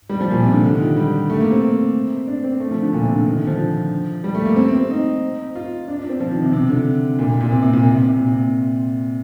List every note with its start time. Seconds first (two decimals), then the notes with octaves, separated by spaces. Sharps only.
0.10 G3
0.21 F3
0.31 A#2
0.42 C3
0.53 D3
0.65 D3
0.75 D#3
0.97 G3
1.30 A3
1.40 A#3
1.52 C4
2.28 D4
2.44 C4
2.60 A3
2.71 F3
2.82 D3
2.93 A#2
3.03 C3
3.15 D3
3.26 D#3
3.37 D3
3.47 F3
4.24 G3
4.35 A3
4.45 A#3
4.56 C4
4.68 C4
4.90 D#4
5.55 F4
5.88 D4
5.98 D4
6.09 C4
6.20 F3
6.31 D#3
6.42 C3
6.53 C3
6.69 D3
7.19 A#2
7.30 A#2
7.41 A#2
7.51 C3
7.63 C3
7.73 A#2
7.84 C3
7.94 C3
8.05 C3
8.17 A#2
8.27 C3